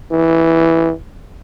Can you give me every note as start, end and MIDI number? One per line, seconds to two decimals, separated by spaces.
0.11 0.93 52